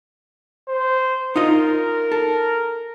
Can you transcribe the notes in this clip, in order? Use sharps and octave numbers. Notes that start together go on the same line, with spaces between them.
C5
D#4 F4 A#4 D#5
A4